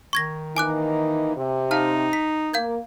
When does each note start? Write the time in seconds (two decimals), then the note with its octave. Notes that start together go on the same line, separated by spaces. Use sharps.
0.13 D#3 C#6 G#6 A#6
0.57 E3 A#3 D#4 G#5 D6 F#6
1.36 C3
1.71 D#4 F5 A5 F6
2.13 B6
2.54 A#3 F5 G6 G#6